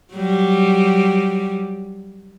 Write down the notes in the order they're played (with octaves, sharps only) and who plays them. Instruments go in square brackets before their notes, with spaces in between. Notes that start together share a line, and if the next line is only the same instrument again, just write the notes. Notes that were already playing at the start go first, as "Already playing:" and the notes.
[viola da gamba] F#3 G3